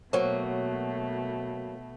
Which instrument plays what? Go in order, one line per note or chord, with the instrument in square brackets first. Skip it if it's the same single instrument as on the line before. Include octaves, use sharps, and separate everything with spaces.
[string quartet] B2 A3 [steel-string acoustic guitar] F#3 A#3 [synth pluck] C5 C#5